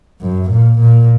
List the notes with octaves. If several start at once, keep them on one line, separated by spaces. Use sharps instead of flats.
F#2
A#2
A#2